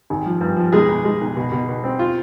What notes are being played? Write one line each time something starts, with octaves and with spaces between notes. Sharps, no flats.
G#1
F3
G2
F3
B1 G#3 G#4
B1
G#3
B1
B2
B2
B2
C4
F4